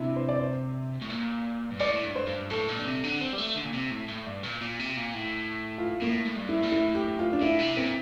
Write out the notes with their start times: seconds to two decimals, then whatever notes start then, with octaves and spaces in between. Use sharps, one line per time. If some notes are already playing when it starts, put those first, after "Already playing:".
Already playing: C3 D4 E4
0.16 C5
0.29 D5
0.39 C5
1.01 A2
1.10 A#2
1.71 G2
1.80 A2 D5
1.93 A2
2.03 G2
2.16 C5
2.27 G2
2.50 A2 A4
2.68 A#2
2.79 D3
2.86 C3
3.04 D3
3.21 C4
3.33 G3
3.38 A3
3.55 D3
3.64 A#2
3.73 C3
3.91 A2
4.08 A2
4.26 G2
4.43 A#2
4.61 A#2
4.79 C3
4.97 A#2
5.14 A2
5.78 F4
6.02 A2 A#3
6.25 A2
6.37 G2
6.49 E4
6.63 A#2
6.72 A2 E4
6.95 G4
7.19 F4
7.33 D4
7.42 A2 E4
7.60 C3
7.77 A#2 C4